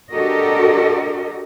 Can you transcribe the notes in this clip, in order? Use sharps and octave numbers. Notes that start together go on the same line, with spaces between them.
D4 F#4 G4 A4 A#4 D#5